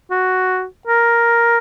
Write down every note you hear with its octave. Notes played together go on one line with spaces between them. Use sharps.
F#4
A#4